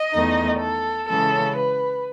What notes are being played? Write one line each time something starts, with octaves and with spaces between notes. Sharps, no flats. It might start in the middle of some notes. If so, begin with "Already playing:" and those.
Already playing: D#5
E2 D#3 A3 D#4
A4
C#3 E3 G#3 C#4 A4
B4